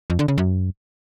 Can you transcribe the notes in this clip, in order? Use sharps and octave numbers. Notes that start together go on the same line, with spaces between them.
F2
D3
C#3
F#2